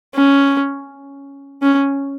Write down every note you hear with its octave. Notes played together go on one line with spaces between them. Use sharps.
C#4
C#4